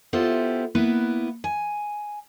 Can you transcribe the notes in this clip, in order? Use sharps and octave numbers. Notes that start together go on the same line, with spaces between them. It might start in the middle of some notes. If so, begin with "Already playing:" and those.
B3 E4 F4 G4 A4 C5
A#3 B3 E4 B4
G#5